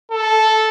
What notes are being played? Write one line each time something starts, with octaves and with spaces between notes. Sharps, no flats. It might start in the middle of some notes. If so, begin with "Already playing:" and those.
A4